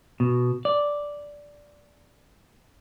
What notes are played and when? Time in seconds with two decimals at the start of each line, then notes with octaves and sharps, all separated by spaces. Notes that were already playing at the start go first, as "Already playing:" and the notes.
0.20 B2
0.65 D5